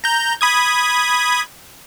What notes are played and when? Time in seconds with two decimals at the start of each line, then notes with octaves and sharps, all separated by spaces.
0.04 A#5 G6
0.41 B5 D#6 G#6